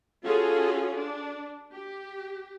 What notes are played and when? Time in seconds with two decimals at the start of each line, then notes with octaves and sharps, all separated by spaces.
0.23 C#4 F4 F#4 G#4 A4
0.96 D4
1.73 G4